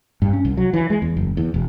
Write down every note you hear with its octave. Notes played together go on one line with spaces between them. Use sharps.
G2
C#4
C2
F#3
E3
G#3
E2
F#1
E2
E1